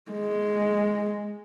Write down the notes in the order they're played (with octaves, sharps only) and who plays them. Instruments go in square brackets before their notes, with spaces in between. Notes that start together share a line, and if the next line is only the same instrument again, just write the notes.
[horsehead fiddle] G#3